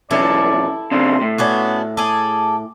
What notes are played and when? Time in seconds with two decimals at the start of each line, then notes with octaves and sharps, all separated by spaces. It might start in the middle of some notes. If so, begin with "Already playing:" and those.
0.11 B1 E2 C#4 E4 A4 D5
0.91 C#3 C4 D4 C6
1.21 A2
1.38 B3 C#4 D4 F#4
1.97 G#4 A4 D6